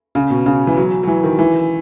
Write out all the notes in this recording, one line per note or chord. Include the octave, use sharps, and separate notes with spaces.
C#3
B2
C#3
E3
F#3
F#3
E3
D#3
E3